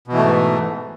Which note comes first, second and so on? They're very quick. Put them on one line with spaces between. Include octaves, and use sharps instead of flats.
B2 E3 A3 G#2